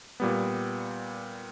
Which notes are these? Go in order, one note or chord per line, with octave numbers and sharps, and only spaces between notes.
A#2 G3 B3